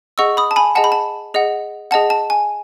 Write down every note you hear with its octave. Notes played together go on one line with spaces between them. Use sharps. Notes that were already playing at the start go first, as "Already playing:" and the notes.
G#4 D#5 F#5 C#6 E6
B5 D#6
A5
G#5 B5
G#4 D#5 F#5 A5
B5
A5
G#4 D#5 F#5
G#4 D#5 F#5 A5
A5
G#5